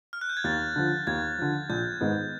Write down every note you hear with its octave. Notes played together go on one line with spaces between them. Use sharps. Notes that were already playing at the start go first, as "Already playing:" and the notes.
F6
F#6
G6
G#6
D#2 A6
D3 F3
D#2 G#6
D3 F3
A#1 G6
G#2 D#3 G#3 B3